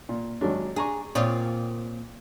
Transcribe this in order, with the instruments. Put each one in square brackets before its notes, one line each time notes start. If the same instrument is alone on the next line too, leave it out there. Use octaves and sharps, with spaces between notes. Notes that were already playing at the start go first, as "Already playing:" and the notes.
[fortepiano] A#2
G#1 F#3 D4
[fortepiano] D4 A#5 C#6 [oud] G#4
[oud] A#2 C4 F4 [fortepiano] C#5 D5 D#6